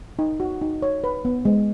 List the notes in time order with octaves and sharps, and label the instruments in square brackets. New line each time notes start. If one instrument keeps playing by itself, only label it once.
[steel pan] D#4
F#4
D#4
C#5
B4
B3
G#3